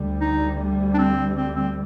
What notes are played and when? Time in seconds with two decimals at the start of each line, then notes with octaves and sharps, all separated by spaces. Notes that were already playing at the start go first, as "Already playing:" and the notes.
Already playing: D2 D3 G3
0.20 D#4
0.94 D4
0.98 C4
1.36 C4
1.56 C4